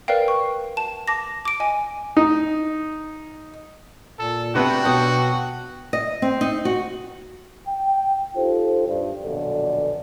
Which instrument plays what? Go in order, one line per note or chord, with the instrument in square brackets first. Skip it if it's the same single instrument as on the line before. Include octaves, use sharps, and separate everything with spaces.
[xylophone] A#4 B4 D5 F5 G5
C#6
A5 E7
A5 D6 A#6
D6 D7
D#5 G#5
[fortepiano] D#4
[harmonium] A#2 [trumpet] A4
[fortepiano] C3 B3 B4 [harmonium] D4 G5 [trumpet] F#4
[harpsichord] B1 [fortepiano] D#6
[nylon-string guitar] D#5
C4
D#4
F#4
[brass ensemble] G5
D#4 F4 G4 A4 C5
G2
A#1 F#2 B2 D3 A4 D5